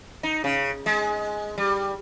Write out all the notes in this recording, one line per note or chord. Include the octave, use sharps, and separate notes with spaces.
D#4
C#3
G#3
G3